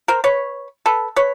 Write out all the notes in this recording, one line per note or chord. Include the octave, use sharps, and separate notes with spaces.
A#4 C5
B4 C#5
A4 B4
B4 C#5